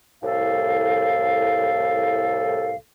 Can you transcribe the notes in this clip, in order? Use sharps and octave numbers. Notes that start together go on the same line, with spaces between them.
C2 A2 A4 F5